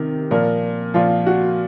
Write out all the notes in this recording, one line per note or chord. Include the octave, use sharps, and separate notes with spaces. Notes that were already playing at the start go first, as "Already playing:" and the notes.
Already playing: C3 D#3 A#4
A#2 F3 A#4
A#2 F3 F4
F#4